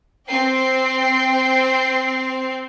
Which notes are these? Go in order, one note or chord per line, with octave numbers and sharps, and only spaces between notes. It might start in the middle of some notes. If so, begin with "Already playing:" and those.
C4 G5 C7